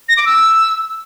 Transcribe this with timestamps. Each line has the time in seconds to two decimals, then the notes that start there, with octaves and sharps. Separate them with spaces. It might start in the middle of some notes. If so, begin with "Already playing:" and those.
0.09 A#6
0.17 D6
0.26 E6